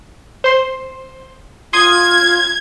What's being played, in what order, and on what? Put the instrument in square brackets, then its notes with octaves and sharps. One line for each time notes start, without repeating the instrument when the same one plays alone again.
[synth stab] C5 C6
[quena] F4 [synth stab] C6 D#6 [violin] G#6